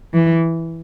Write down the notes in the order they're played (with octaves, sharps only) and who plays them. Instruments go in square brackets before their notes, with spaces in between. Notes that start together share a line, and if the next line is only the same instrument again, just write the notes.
[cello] E3